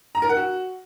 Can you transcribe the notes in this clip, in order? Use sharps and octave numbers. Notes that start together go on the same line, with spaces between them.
A#5
A#4
F#5
F#4